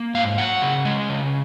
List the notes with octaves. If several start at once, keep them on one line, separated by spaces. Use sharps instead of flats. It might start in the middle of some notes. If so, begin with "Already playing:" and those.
Already playing: A#3
G#2 F5
F#3 F#5
C#3
G#3
C#3